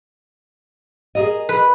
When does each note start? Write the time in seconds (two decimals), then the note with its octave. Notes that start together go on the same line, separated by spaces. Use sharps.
1.15 G#4 A#4 D#5
1.49 B4